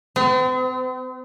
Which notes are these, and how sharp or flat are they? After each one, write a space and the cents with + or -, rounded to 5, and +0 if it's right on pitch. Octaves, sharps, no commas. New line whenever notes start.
C4 -45